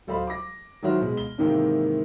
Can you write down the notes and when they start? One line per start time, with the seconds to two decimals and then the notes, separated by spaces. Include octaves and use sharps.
0.07 D1 A4 C5 D#5 F5 B5
0.27 D6 A#6
0.82 D#3 F#3 E4 F#4 C5 F6
1.01 B2 G#3
1.17 G7
1.38 G#2 C3 D#3 E3 A#3 C4